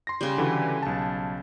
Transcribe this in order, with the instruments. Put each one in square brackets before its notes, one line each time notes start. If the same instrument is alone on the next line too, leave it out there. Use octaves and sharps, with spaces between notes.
[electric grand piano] C6 A#6
[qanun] C#3 G3
[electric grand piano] D3 E3 F#4
B1 A5